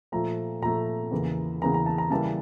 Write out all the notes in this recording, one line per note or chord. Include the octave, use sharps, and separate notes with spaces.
A#2 F3 A3 A#5
A#2 F3 A3 A#5
E2 C#3 E3 A#3
E2 C#3 E3 A#3 A#5
A#5
A5
A#5
C#3 E3 G3 A#3 A5